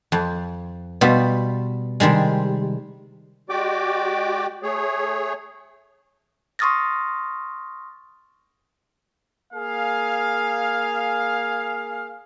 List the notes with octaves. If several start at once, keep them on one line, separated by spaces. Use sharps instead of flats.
F2
B2 G3 B3 F4
C3 D#3 G3 G#3
G#3 F#4 G4 D5 G5 D6
A3 G#4 C#5
C6 C#6 D#6 F6 A6 A#6
A#3 G#4 F5